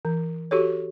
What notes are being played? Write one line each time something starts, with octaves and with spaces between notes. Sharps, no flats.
E3
F#4 G4 A4 C#5